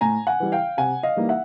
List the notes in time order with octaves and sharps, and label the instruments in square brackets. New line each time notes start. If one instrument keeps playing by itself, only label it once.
[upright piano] A2 G#5 A#5
F#5 G#5
E3 G3
F5 G5
C3 F#5 G#5
D#5 F5
E3 G3 A#3 D#4
E5 F#5